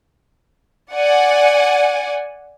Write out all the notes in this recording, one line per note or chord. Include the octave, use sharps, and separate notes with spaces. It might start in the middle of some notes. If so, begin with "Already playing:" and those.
D5 F#5 G#5